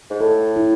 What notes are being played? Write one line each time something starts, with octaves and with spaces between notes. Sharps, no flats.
G#2
A2 A4
E4